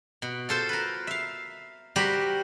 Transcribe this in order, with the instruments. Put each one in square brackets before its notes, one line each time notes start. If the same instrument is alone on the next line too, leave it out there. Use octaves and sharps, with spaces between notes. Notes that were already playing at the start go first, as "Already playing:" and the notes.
[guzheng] B2
F4 A4 C5
A#4 B4
E5 F5
G3 F#4 G4 A#4 C5 B5